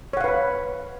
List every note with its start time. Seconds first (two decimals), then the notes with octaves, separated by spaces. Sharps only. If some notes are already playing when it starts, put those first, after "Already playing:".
0.13 C#5
0.17 F#5
0.21 F5
0.24 B4
0.28 B5